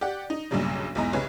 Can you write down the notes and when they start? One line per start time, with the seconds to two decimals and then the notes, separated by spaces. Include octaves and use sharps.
0.01 G4 D5 F#5
0.30 D#4
0.51 B1 G2 A#2 C#3 F#3 G3
0.95 B1 E2 G#2 E3 D#5 A#5
1.13 C2 C#3 B4 C#5